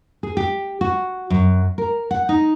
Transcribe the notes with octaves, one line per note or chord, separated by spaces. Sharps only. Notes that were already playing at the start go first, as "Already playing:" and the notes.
G#4
G4
F#4
F#2
A#4
F#5
D#4